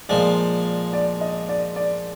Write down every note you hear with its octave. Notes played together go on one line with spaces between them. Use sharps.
A#2 F3 G#3 D5
D5
D#5
D5
D5